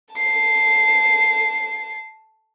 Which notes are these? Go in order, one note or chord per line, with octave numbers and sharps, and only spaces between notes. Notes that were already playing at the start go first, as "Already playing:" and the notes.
A5 C7